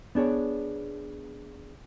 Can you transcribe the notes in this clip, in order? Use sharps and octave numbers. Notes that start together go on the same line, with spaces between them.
B3 D4 G#4 C#5